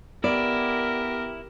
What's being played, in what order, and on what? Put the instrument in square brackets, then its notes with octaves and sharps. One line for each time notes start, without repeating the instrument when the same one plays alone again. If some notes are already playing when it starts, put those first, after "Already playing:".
[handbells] B3 [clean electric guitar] E4 [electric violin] G4 A#4 [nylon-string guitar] D5